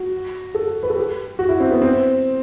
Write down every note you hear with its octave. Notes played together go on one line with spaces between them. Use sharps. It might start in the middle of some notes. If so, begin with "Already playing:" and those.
Already playing: F#4
A4
B4
A4
G4
F#4
E4
C4
B3
C4